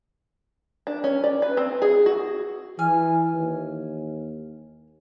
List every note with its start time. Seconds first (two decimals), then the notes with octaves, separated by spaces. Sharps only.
0.87 D4
1.04 C#4
1.24 D5
1.42 B4
1.57 C4
1.82 G#4
2.06 F#4
2.79 E3 G#5 F6
3.34 D#2